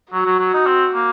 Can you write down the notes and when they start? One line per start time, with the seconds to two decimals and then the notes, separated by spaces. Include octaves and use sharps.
0.12 F#3 F#4
0.25 F#3
0.39 F#3
0.54 D#4
0.66 C4
0.94 A#3